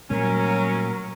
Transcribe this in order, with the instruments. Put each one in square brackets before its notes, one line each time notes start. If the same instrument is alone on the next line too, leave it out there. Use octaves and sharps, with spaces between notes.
[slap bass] A#2 G3 A3 [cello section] F#3 [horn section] C#4 [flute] A#4